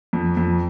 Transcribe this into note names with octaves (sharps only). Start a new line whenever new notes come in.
F2
F2